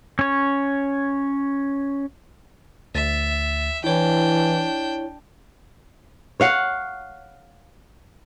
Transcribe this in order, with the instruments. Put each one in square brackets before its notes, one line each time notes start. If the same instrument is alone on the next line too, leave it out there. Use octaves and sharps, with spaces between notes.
[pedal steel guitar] C#4 C#5
[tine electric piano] D2 A6 [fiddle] E5
[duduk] E3 [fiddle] D4 G5 [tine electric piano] E4 C#5
[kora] C#5 F5 F#5